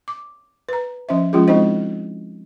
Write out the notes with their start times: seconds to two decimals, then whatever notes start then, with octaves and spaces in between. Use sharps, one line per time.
0.08 D6
0.69 B4 A#5
1.09 F3 C#4 C5 E5
1.33 F3 G#3 C#4 F4 G#4
1.48 G#3 C4 D#4 E4 C5 D#5